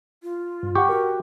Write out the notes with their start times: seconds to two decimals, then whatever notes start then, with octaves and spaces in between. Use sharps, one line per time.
0.23 F4
0.63 G2
0.75 G4 F#5 C#6
0.89 F#4 A#4